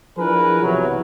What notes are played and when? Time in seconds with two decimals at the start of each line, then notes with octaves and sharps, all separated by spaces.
0.18 F3 D4 E4 G#4 A#4 B4
0.62 B1 C3 E3 F#3